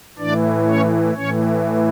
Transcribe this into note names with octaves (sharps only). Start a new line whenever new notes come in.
A2 E3 D4 D5
C#4 C#5
A2 E3 C#4 C#5